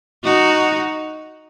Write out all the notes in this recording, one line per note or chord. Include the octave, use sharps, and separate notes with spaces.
D#4 F#4